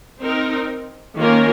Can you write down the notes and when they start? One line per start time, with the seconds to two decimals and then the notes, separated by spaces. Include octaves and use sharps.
0.21 C4 D#4 A#4
1.17 D#3 A#3 C#4 F4 A#4